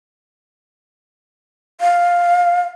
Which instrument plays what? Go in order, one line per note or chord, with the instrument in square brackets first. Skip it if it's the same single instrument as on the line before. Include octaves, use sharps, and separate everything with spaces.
[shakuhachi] F5